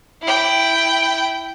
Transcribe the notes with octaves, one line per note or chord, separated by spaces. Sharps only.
E4 G5